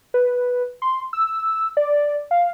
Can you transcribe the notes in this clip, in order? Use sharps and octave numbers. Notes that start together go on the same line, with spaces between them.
B4
C6
E6
D5
F5